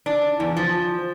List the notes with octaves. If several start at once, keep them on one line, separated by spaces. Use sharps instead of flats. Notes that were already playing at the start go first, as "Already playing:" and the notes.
D4
E2
F3